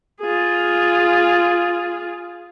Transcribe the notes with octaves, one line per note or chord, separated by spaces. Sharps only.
F4 G#4